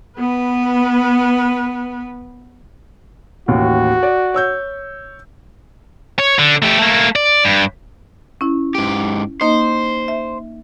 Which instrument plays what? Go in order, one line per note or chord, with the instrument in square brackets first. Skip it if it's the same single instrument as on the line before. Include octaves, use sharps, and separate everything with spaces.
[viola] B3 B4
[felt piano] A1 D#2 [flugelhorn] F#4
[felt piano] D5
C#5 E6 G6
[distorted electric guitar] C#5
D3
A3 G4
A3 A#3
D5
G2
[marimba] C#4 E4
[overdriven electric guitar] G#2 G4
[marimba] A#3 D#4 D#5 [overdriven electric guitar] C5
[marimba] E5